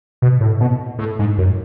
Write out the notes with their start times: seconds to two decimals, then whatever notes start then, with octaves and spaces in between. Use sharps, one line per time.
0.22 B2
0.40 A2
0.60 B2
0.99 A2
1.19 G#2
1.38 F#2